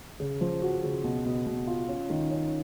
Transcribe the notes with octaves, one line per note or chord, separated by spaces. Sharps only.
C#3
F3
F#4
C#3
B2
B2
B2
F4
C#4
D#3
C#4